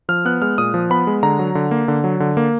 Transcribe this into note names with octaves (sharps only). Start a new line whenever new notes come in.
F3 F6
B3 F#6
G#3 F6
A#2 D#6
F3
B3 B5
G#3
D3 A#5
F#3
D3
A#3
D3
F#3
D3
A#3